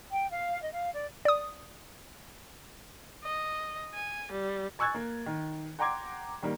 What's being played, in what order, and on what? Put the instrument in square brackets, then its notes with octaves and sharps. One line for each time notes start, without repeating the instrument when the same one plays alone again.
[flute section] G5
F5
D#5
F5
D5
[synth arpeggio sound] D5 D#6
[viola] D#5
G#5
G3
[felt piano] G#5 C#6 E6 F#6 G#6 A6
A#3
D#3
F#5 G5 A#5 C6 D6 G#6
D#3 G3 A#3